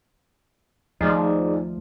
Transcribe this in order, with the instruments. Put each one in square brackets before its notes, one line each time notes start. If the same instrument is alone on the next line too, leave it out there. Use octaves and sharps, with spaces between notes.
[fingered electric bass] D#2 A3 [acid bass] F3 [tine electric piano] D#4 G#4 D5